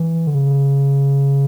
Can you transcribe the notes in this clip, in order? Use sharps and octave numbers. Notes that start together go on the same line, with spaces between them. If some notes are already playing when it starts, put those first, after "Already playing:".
Already playing: E3
D3
C#3